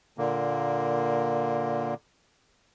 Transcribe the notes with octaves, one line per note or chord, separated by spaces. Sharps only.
A#2 D3 A#3